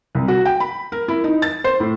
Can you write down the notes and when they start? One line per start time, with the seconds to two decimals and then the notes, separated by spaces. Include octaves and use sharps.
0.15 C2
0.28 F#4
0.45 G5
0.60 B5
0.92 A#4
1.08 E4
1.24 D#4
1.42 A6
1.64 C5
1.80 A2